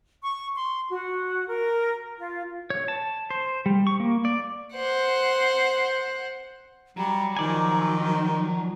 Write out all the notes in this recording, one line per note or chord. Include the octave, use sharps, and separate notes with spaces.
C#6
C6
F#4
A#4
F4
C#5
A5
C5
G3
C#6
A#3
D5
C5 F#5
F#3 G3 A#5
D#3 F3 D5 G#5